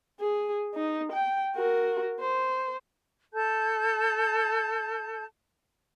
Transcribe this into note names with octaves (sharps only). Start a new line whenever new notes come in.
G#4
D#4
G5
F#4 A#4
C5
A4 A5 G6